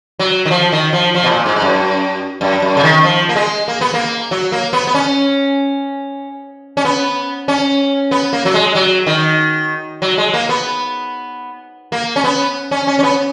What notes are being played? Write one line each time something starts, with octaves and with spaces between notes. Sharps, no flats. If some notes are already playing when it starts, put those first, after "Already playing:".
F#3
D#3
F3
D#3
F3
F3
B2
A#2
G#2
G#2
F#2
F#2
F#2
C#3
D#3
F3
A#3
G#3
A#3
B3
A#3
F#3
A#3
B3
B3
C#4
C#4
B3
C#4
B3
A#3
F#3
G#3
F#3
D#3
F#3
G#3
A#3
B3
A#3
C#4
B3
C#4
C#4
C#4
B3